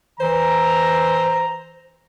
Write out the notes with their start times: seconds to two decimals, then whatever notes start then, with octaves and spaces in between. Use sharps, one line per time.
0.20 E3 C5 A#5